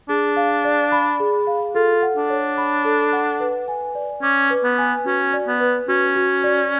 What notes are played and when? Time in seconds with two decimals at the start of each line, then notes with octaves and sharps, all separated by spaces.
0.09 D4 G#4
0.36 F5
0.64 D5
0.92 B5
1.20 G#4
1.47 F5
1.75 F4 A4
2.02 F#5
2.17 D4
2.30 C#5
2.57 B5
2.84 A4
3.13 F#5
3.40 B4
3.68 G#5
3.95 D5
4.22 C#4 D6
4.50 B4
4.64 B3
4.78 G#5
5.06 C#4 F#4
5.33 D5
5.47 B3
5.60 B4
5.88 C#4 F#4
6.16 F#4
6.44 D5